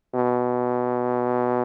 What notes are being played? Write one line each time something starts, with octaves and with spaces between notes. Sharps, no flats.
B2